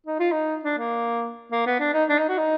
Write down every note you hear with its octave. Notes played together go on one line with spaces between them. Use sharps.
D#4
F4
D#4
D4
A#3
A#3
B3
D4
D#4
D4
D#4
F#4
D#4